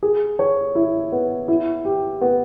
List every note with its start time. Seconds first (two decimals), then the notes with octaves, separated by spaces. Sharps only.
0.03 G#4
0.39 C#5
0.75 E4
1.12 B3
1.48 E4
1.85 G4
2.21 B3